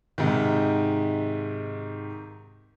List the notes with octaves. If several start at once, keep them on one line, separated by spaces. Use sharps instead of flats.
G#2 C3 D#3